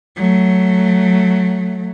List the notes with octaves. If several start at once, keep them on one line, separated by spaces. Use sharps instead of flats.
F#3 A3